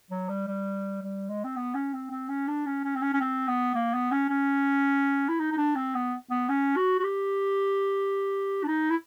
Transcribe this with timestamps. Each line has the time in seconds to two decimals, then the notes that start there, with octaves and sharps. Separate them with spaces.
0.11 F#3
0.29 G3
0.47 G3
1.02 G3
1.29 G#3
1.44 C4
1.56 B3
1.75 C#4
1.93 C4
2.11 C4
2.29 C#4
2.48 D4
2.66 C#4
2.84 C#4
2.96 C4
3.02 C#4
3.13 C#4
3.20 C4
3.48 B3
3.75 A#3
3.94 B3
4.12 C#4
4.29 C#4
5.29 E4
5.40 D#4
5.52 D#4
5.58 D4
5.76 C4
5.95 B3
6.30 B3
6.49 C#4
6.77 F#4
7.00 F#4
7.04 G4
8.64 D4
8.68 D#4
8.90 E4